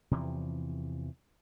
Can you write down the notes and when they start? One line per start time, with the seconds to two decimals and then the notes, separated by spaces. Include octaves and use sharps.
0.11 E2 C3 E3 F3